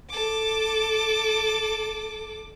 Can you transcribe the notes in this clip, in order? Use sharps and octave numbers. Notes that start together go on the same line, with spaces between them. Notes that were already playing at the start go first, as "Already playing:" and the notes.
A4 D6